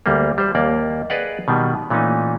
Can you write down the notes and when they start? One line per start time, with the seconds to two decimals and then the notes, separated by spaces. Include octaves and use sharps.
0.06 D2 G3 A#3
0.38 G3 C5
0.55 D#2 A#3 D5
1.10 G#4 B4 D5 D#5 F5 F#5
1.48 B2 D#3 G3
1.90 A#2 E3 A3 C#4 D#4